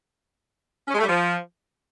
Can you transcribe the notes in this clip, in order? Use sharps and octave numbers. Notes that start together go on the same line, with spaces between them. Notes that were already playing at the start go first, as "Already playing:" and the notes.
C#4
G#3
A3
G3
F3